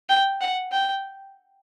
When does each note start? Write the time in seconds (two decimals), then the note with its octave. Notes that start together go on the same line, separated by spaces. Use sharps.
0.09 G5
0.41 F#5
0.72 G5